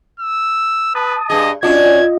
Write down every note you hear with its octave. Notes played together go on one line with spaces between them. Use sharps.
E6
B4 A5 D#6
G2 G#4 D#5
C#4 D4 F4 F#4 D#5 G#6